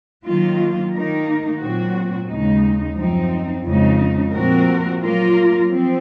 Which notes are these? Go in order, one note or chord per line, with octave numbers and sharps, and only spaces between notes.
D#3 F#3 A#3 F4
D#3 A#3 D#4 A#4
A#2 F#3 C4 F#4
D#2 C#3 G#3 D#4
F#2 F3 C4 D#4
F2 C#3 G#3 D#4
A#2 F3 C4 F#4 A#4
F#3 A#3 F4 A#4
F3 C4